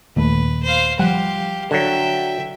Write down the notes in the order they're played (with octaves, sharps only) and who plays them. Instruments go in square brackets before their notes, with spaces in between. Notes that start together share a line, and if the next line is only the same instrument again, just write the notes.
[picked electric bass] D#1 D#2 A3 [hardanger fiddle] B4
[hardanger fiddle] C5 F5
[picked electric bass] F3 G3 [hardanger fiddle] G4 F5 [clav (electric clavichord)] F#5
[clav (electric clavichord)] D3 F#3 [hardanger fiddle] E5 G5